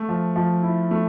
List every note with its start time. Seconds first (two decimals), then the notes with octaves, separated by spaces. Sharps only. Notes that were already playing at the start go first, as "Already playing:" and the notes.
Already playing: A3
0.09 F3
0.36 F3
0.63 E4
0.91 A3